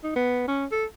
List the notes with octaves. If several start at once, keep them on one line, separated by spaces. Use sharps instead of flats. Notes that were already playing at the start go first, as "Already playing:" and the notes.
D#4
B3
C#4
A4